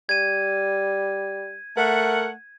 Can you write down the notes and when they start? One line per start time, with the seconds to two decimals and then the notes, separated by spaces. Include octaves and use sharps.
0.09 G3 G#6 D#7
1.77 A3 A#4 F#5